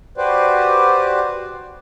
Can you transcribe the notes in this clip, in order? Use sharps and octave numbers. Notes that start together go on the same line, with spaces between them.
F#4 G4 B4 C5 D5